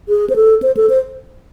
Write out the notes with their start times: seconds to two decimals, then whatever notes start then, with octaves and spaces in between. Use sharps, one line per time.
0.09 G#4
0.30 C5
0.36 A4
0.62 C5
0.77 A4
0.90 C5